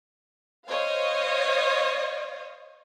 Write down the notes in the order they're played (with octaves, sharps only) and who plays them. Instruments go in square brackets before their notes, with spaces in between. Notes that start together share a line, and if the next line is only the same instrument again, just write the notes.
[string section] C5 C#5 D#5 F5